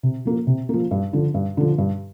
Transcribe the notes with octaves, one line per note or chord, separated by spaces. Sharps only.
C3
F3 A#3
C3
F3 A#3
G2
D3 F3
G2
D3 F3
G2